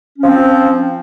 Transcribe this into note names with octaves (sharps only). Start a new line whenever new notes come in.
F3 C4 C#4